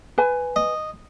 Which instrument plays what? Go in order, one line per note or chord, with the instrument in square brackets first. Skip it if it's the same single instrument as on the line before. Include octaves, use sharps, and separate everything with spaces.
[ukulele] B4 G#5
[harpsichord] D#5